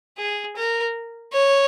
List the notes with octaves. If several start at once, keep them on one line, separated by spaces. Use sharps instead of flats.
G#4
A#4
C#5